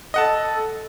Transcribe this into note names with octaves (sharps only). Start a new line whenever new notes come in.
A4 D#5 F#5 A5